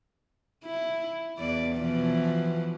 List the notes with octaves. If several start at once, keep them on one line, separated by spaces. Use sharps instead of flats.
E4
E2 E3 D5
B2 E3 F3